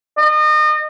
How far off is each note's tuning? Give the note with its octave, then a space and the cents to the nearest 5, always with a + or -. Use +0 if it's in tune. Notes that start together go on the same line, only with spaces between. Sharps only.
D#5 -35